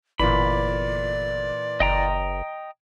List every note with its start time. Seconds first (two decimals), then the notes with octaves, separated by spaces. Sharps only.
0.19 G1 A#2 E3 D5 B5
1.80 F#1 D#5 G5 A#5